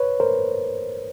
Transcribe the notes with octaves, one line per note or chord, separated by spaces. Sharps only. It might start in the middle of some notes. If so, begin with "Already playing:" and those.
Already playing: B4 C#5
A#4 C5